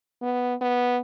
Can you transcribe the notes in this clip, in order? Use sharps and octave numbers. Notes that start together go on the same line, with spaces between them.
B3
B3